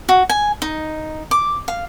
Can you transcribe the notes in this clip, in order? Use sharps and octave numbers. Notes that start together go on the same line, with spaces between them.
F#4
G#5
D#4
D6
F5